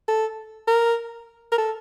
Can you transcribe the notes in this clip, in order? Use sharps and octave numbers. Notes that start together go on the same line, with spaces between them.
A4
A#4
A#4
A4